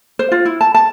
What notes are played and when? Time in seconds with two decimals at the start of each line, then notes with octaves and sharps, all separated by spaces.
0.19 C5
0.32 F4
0.45 E4
0.61 A5
0.75 A5